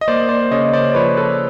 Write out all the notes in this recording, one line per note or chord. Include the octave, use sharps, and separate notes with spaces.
D#5
A#3 C5 D5
C5 D5
C#3 C#5 D#5
C5 D5
D5
F3 B4 C#5
A4 B4